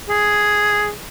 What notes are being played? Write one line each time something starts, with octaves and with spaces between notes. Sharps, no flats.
G#4